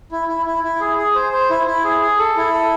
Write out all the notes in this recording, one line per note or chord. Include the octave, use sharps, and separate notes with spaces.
E4
E4
E4
E4
G#4
G#4
C5
C5
E4
E4
G#4
G#4
A4
E4
A4